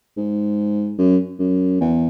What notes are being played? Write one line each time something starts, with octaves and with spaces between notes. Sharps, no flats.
G#2
F#2
F#2
E2